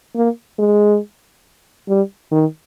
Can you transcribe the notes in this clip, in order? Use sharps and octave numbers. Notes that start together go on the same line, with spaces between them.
A#3
G#3
G3
D#3